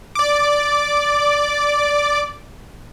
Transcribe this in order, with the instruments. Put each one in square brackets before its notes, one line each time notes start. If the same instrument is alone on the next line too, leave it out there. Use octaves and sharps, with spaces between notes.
[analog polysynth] D5 D6